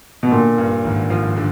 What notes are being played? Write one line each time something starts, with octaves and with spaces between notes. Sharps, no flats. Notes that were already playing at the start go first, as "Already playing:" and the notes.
B2
A#2 D3
G2
G#1
F3
D3